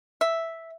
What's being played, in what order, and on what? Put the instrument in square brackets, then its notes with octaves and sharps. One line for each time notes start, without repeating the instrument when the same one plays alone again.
[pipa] E5